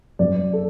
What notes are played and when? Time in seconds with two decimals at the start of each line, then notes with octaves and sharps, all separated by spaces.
0.19 F#2 D5
0.53 A4